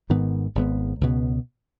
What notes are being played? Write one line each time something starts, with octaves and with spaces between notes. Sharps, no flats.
G#1 G#2 D#3 B3
G#1 G#2 D#3 B3
C#2 B2 B3